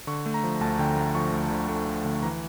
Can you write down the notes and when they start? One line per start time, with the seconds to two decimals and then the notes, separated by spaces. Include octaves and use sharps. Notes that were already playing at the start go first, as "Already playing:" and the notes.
0.07 D3 C#6
0.26 A3
0.34 A#5
0.44 F3
0.61 D2 A5
0.79 D3 G5
0.97 A3 A#5
1.15 F3 C#6
1.32 D2
1.51 D3
1.69 A3 C#6
1.87 F3
2.04 D2
2.22 E3 A#5